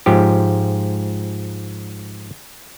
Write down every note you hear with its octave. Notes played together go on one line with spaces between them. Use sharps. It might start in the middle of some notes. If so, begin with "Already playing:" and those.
G#2 F3 G4